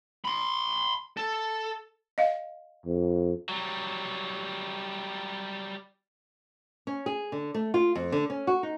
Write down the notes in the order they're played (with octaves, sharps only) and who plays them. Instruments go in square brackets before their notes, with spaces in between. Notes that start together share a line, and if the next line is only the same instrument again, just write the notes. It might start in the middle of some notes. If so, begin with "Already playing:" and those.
[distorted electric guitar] B5 C6
A4
[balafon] D#5 F5
[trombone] F2
[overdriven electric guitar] F#3 G3
[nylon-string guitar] C#4
G#4
D3
A3
F4
F2
D3
C#4
F#4
D#4